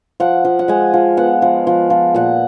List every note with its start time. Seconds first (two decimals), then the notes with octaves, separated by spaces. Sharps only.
0.20 F3 F#5
0.45 F3
0.59 F#5
0.68 G#3 G#5
0.94 F3
1.17 B3 F#5
1.42 F3
1.67 F3
1.90 F3
2.15 A#2 F#5